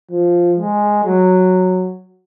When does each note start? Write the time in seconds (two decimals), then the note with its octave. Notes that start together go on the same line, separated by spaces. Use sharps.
0.11 F3
0.58 G#3
1.05 F#3